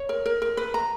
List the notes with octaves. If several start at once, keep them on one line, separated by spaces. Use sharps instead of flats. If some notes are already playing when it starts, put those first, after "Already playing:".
Already playing: C#5
A#4
A#4
A#4
B4
A#5